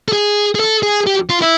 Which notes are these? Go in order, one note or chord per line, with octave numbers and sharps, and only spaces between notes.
A4
G#4
G#4
A4
G#4
G4
F4
E4